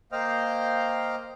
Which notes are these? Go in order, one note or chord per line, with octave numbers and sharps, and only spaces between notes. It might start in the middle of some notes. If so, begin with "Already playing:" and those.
A#3 C5 D#5 F5 G5 F6